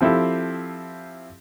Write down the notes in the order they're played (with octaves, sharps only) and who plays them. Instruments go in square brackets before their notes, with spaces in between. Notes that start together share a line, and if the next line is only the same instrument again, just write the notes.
[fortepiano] F3 C4 E4 G4 A4